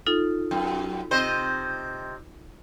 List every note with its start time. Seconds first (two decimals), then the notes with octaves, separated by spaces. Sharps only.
0.06 D#4 F4 A4
0.51 F#2
1.11 C3 C5 D#5